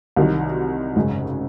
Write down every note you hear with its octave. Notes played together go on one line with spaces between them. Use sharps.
C2 C3 D#3 F#3
G#1 F#2 C#3 G#3 C#4